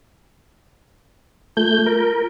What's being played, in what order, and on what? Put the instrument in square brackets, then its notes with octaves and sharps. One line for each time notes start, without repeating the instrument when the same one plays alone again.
[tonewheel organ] A3 G6 [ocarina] F4
[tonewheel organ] A#4